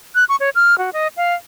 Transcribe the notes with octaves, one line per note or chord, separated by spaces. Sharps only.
F#6
C#6
C#5
F6
F#4
D#5
F5